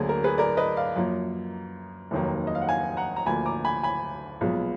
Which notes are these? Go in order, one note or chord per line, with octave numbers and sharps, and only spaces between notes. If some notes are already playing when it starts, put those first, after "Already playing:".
Already playing: D2 D3 F#3 A#3 G#4
A#4
G#4 B4
A#4 D5
B4 D#5
D5 F5
F#2 F3 A#3
F1 D#2 D#3 F#3 A#3
D#5
F5
F#5
F5 G#5
F#5 A#5
A#5
D2 D3 F3 A#3 G#5 B5
A#5 D6
G#5 B5
G#5 B5
B1 A#2 F3 G#3 B3